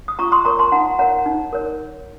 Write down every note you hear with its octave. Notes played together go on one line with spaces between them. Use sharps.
D#6
F4 A#5 C#6
C6 D#6
A#4 C#5 A#5 C#6
A5 C6
D#4 F#5 A#5
A#4 C#5 F#5 A#5
D#4
A#4 C#5